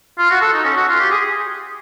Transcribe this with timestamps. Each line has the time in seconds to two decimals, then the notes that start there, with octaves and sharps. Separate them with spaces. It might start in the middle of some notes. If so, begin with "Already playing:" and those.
0.18 F4
0.30 F#4
0.41 A4
0.53 D#4
0.64 C#4
0.76 F#4
0.89 F4
0.99 G4
1.11 G#4